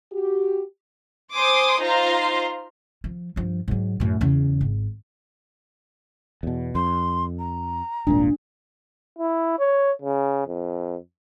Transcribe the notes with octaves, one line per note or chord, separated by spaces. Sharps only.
F#4 G4
C5 G#5 C6 D6 D#6
D#4 F4 C5 F5 A#5 C6
F3
G2 F3
G#2 F#3
F#2 A2
E2 C#3
G#1
E2 B2
F2 C6
A#5
D#1 G#1 A#2 D4
E4
C#5
C#3
F2